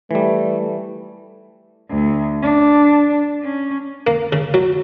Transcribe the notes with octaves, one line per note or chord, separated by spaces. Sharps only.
E3 G3 A3
D2
D4
C#4
A#3
C#3
F#3